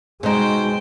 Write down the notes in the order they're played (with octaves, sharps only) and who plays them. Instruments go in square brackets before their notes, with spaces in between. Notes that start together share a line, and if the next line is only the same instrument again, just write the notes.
[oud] B2 D#4 [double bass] G#3 [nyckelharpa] C5 G5